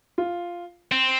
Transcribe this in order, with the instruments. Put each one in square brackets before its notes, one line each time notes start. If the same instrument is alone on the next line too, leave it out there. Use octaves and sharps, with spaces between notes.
[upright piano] F4
[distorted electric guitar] C4